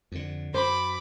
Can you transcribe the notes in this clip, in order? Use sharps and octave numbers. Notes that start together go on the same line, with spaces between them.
F2 D3
F#2 C5 B5 D6